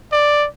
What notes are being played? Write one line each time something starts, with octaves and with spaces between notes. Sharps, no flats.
D5